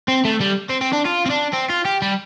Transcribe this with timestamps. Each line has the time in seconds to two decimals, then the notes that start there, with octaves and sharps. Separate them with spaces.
0.08 C4
0.25 A3
0.41 G3
0.69 C4
0.81 C4
0.93 D4
1.05 F4
1.26 C4
1.30 D4
1.53 C4
1.70 F4
1.85 G4
2.02 G3